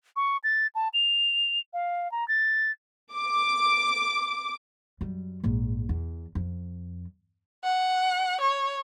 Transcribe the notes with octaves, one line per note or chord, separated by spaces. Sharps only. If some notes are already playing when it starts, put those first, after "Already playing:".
C#6
A6
A5
F7
F5
A#5
A6
D6
F#2 G3
A#1 G#2
E2
F2
F#5
C#5